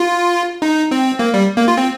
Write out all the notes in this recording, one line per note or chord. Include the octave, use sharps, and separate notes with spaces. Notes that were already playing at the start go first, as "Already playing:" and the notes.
Already playing: F4
D#4
C4
A#3
G3
A#3
F4
C4